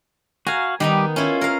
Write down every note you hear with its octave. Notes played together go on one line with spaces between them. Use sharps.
F#4 F5 G#5 A#5
D#3 G3 B3 D#4 G4
C#4 E4 F4
A#4 F5